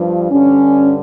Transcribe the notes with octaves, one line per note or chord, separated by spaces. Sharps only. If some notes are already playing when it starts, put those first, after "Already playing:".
Already playing: G2 F3
G2 D3 G3 C#4